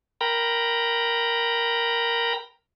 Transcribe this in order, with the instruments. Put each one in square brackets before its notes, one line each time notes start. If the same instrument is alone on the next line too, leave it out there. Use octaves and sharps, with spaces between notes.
[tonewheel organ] A#4 G5 A#5 B5